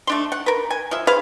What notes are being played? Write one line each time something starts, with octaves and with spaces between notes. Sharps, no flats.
A3 D4 C6
F#5
A#4 B4
G#5
F3 E5
G#4 B4 C5 F5